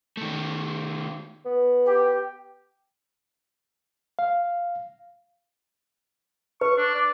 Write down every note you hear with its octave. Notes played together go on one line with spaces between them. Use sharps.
D#3 A3
B3
G4
F5
B4 C#6
D4
D5